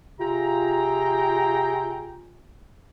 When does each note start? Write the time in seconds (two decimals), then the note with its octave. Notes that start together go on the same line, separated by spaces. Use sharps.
0.19 C3 F4 G#4 G5 A#5